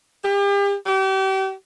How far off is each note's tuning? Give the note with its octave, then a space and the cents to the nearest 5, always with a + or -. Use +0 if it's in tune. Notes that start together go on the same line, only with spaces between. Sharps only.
G4 +40
G4 -35